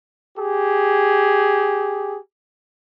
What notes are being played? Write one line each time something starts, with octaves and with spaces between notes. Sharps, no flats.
G4 G#4